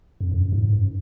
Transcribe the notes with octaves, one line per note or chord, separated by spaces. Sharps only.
F2
F#2
G#2
F#2